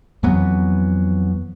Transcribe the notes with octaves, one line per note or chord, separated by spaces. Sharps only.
F2 E3 F#3 B3